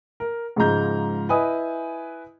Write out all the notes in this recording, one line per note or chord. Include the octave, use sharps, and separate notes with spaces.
A#4
G#2 C#3 F3 G#3 A#5 G6
E4 B4 D#5 G#5 D#6